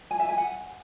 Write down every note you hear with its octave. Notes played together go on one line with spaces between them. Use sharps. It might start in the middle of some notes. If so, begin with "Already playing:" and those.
G#5
E5
G#5
F#5